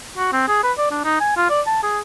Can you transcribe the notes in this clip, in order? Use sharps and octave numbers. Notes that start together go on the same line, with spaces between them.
F#4
C4
G#4
B4
D5
D4
D#4
G#5
F4
D5
A5
G#4